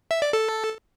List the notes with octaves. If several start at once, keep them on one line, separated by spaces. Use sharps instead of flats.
E5
D5
A4